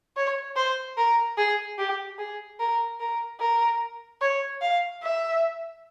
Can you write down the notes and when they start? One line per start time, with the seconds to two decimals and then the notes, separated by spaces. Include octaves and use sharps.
0.17 C#5
0.56 C5
0.97 A#4
1.37 G#4
1.78 G4
2.19 G#4
2.59 A#4
3.00 A#4
3.40 A#4
4.21 C#5
4.61 F5
5.03 E5